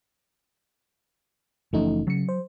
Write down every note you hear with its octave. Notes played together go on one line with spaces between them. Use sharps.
F#1 E3 F3 A3 C#4 D#4
C#3 F#3 C#7
C5